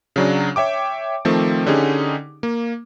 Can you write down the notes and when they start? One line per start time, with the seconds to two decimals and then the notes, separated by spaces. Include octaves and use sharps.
0.16 C#3 F#3 D4
0.56 C#5 E5 G5 D6
1.25 D#3 F3 A3 C4
1.66 D3 C#4 D#4 G4 G#4
2.43 A#3